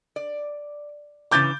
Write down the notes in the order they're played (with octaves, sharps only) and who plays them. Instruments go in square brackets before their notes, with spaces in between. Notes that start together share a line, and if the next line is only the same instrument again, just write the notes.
[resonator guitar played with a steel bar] D5
[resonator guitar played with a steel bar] C#3 E3 A#5 [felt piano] D6 G6 A6